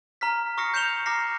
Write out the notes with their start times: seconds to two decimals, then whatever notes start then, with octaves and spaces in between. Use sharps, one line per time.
0.21 A#5 F6 B6
0.58 C#6 D#6 F6 A#6 C7 C#7
0.73 C#6 G6 C#7 E7 F7 G7
1.06 A#5 D6 F6 A#6 C7